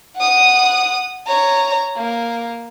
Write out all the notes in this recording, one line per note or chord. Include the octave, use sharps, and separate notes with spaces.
F#5 D#6
C#5 A#5
A#3